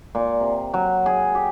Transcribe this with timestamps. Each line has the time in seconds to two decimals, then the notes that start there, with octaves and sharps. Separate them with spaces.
0.15 A#2
0.41 C3
0.74 F#3
1.06 G#4
1.35 G4